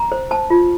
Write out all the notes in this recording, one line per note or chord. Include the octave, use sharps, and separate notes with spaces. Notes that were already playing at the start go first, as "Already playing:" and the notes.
Already playing: A#5
C5
C5 A5
F4